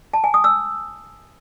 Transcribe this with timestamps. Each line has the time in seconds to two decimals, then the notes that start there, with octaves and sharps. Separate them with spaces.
0.13 A5
0.24 G#5
0.34 D#6
0.44 E6